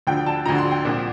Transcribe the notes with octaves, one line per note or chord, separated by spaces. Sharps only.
D2 D3 F3 G5
A5
D2 D3 F3 A#5
C6
G5
C2 A#2 F3